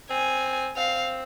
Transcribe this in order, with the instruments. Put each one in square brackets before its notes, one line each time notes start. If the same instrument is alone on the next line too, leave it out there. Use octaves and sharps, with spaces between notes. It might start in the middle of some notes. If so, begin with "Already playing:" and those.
[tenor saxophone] C4 [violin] G#5
[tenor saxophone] C4 [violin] F5